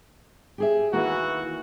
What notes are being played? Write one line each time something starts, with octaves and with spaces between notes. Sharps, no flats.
G4 G#4 E5
D#2 E3 A#3 F#4